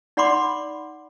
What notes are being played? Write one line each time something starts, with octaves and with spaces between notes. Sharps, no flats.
D#4 D5 F#5 B5 C6 D6